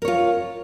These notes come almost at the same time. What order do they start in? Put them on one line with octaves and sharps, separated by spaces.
A#4 C#5 F4